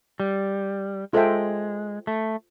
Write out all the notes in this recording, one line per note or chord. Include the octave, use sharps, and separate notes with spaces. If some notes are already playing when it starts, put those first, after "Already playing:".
G3
G#3 F4 A4 C5 E5 G5
A3